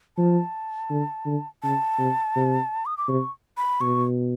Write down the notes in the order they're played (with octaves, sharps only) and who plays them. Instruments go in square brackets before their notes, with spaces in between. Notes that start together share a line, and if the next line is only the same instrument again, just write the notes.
[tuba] F3 [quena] A5
[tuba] D3
D3
[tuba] C#3 [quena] A5
[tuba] C3
C3
[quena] D#6
D6
[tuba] C3 [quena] C#6
[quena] B5
[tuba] B2 [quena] C#6